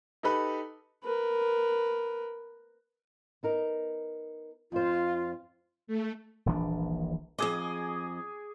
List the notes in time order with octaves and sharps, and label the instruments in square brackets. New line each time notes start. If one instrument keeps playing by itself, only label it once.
[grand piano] D#4 G4 A4 B4 B5
[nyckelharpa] A#4 B4
[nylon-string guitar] B3 D#4 A#4
[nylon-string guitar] F2 C5 [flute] F4
[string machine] A3
[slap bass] D#1 A#1 E3 D4
[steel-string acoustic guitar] F2 D#5 [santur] G#4 G#5 D6